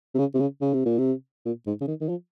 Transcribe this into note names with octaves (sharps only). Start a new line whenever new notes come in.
C3
C#3
C3
C#3
C#3
C3
A#2
C3
A#2
G#2
C#3
D#3
D#3
F3